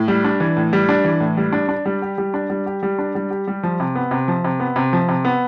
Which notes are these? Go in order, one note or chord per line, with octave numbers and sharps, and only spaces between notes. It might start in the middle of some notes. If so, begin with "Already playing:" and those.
Already playing: A2
G3
D4
E3
A2
G3
D4
E3
A2
G3
D4
D4
G3
G4
G3
D4
G3
G4
G3
D4
G3
G4
G3
F3
C3
B3
C3
F3
C3
B3
C3
F3
C3
B3